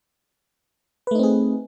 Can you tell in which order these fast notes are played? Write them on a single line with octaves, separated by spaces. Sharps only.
B4 A3 D#4 C4 G#4